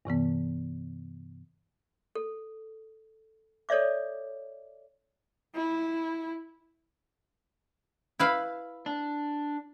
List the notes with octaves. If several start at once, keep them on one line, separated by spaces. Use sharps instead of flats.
G2 C3 E3 B3
A4
A4 C#5 D5 E5 D6
E4
E4 B4 F5
D4